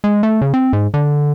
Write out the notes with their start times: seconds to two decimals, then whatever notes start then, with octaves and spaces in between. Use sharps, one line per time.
0.04 G#3
0.23 A3
0.42 C#3
0.54 C4
0.73 G#2
0.94 D3